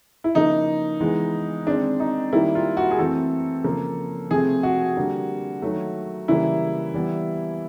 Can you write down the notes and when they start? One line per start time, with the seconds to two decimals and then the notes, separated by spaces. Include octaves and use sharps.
0.24 E4
0.35 C#3 F3 A#3 D#4
1.00 E3 G#3 B3
1.67 D#3 G#3 C4 D4
2.00 D#4
2.33 D#3 G3 A#3 E4
2.55 F4
2.77 F#4
2.91 G#4
2.98 E3 A3 C4 A4
3.64 C#3 F3 A#3
4.30 C3 F3 A3 C4 G#4
4.63 F#4
4.97 D3 G3 A#3
5.62 D#3 F#3 A3
6.28 C#3 E3 G3 A#3 E4
6.94 E3 G3 B3